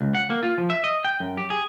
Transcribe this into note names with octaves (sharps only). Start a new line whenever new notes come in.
C#2
F#5
A#3
F4
F3
E5
D#5
G5
F#2
G4
G#4